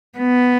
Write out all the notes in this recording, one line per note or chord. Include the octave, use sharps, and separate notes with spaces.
B3